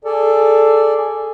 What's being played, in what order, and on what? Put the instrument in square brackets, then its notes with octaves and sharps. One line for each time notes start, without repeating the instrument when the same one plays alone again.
[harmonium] G#4 D5 [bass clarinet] A4